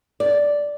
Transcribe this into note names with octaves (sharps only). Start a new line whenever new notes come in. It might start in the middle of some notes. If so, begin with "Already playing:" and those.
D5